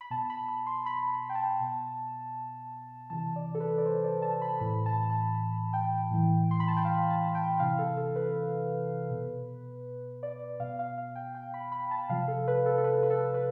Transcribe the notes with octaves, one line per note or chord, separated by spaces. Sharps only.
B5
B2 A5
B5
B5
C6
B5
B5
G5
A5
B2
C3 E3 A5
D5
A4
B4
D5
C5
D5
A5
B5
A2 E3 B5
A5
A5
G5
A2 E3
C6
B5
A5
G5
F5
A5
G5
C3 E3 F5
A4
A4
B4
B2
D5
B2 F5
F5
F5
G5
G5
B5
B5
A5
C3 F3 F5
A4
B4
A4
A4
B4
B4
A4
B4